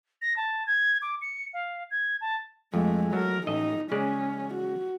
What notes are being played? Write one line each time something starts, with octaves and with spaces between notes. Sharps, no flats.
A#6
A5
G#6
D6
C#7
F5
G#6
A5
F2 G#3 A3
F#3 A3 A#4
A1 D#4 D#5 E5
C#3 G#3 C#4 D5
F#4